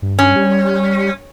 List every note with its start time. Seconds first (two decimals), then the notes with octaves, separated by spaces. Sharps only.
0.02 G2
0.19 C#4
0.36 G3